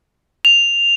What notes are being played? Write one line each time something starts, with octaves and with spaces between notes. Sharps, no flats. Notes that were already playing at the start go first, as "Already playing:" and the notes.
F7